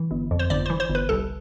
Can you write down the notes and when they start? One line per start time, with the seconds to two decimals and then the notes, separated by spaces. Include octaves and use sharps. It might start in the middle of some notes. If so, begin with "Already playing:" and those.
Already playing: E3
0.11 G1
0.31 F2
0.39 C5
0.50 G1 D5
0.66 E3 C5
0.80 C5
0.90 G1
0.95 B4
1.09 C2 A4